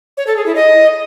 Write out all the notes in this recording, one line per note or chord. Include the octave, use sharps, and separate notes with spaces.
C#5
A4
G#4
E4
D#5